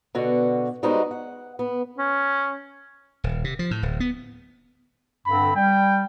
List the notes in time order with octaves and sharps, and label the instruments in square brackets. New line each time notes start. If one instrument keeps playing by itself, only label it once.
[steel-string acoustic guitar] B2 D3 F#4
G3 G#3 B3 D#4 F#4 C5
F#5
B3
[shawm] C#4
[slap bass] D#1
C3
F3
A2
D1
B3
[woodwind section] G2 D3 C4 [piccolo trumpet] B5
[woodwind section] G3 [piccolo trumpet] G5